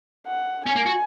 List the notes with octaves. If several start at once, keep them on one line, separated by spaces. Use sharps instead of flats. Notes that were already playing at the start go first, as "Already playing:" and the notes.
F#5
C#4 G#5
A#3
F#4